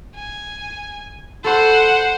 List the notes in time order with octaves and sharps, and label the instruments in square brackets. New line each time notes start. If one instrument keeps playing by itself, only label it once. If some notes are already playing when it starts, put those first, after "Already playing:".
[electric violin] G#5
[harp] A4 B5 C#6 [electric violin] C5 F#5